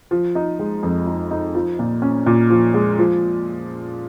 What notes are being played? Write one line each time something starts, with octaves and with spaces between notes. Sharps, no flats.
F3
D#4
G#3
F2
D#4
D#4
F3
A#2
C#4
A#2
F3
G#3
F3